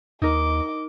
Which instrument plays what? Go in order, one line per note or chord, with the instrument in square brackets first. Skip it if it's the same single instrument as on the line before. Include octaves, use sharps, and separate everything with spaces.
[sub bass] D#2 [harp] D#4 A#4 [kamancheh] D#5 D6